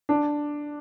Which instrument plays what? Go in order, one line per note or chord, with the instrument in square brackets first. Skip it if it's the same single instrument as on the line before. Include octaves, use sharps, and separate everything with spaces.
[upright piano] D4